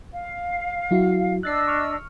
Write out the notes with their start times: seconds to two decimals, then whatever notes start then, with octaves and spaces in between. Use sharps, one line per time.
0.12 F5
0.91 F#3 E4 F#4
1.43 D4 D#5 E6 F#6 A6 C7
1.68 C#6 F6